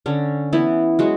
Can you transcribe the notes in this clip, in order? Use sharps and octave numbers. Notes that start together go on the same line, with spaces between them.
D3 C#4
E3 B3 E4
F#3 G#3 F#4